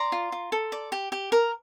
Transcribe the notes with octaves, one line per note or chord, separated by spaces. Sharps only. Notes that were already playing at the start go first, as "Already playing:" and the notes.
Already playing: D5 A#5 C6
F4
F4
A4
D5
G4
G4
A#4